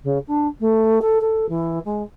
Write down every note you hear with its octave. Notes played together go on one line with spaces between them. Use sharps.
C#3
D4
A3
A4
A4
E3
G#3